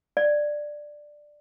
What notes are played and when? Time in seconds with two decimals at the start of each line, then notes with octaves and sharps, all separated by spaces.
0.17 D5